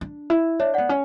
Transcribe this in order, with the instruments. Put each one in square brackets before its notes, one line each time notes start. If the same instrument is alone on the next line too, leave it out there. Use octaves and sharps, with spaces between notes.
[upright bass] D4
E4
[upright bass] D4 [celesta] C#5 E5
[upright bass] B3 [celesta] D5 F#5
[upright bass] C#4